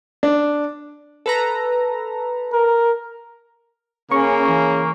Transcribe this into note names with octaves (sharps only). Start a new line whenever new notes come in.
D4
A4 B4 A#5
A#4
C#3 A#3 C#4 C#6
E3 C#4